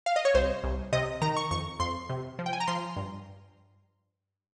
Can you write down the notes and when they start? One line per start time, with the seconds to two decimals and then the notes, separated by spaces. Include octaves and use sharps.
0.06 F5
0.16 D#5
0.25 C#5
0.34 C2 C5
0.64 C2
0.93 C3 D#5
1.22 D#3 A#5
1.36 C#6
1.51 F2 C#6
1.80 F2 C6
2.09 C3
2.39 F3
2.46 G5
2.53 G#5
2.60 A#5
2.67 F3 C6
2.96 G2